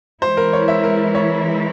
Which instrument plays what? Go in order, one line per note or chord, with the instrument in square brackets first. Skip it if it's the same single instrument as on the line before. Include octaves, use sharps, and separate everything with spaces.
[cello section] E3 G#3 E4 [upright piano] C5
[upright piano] A#4
C#5
E5
A#4
C#5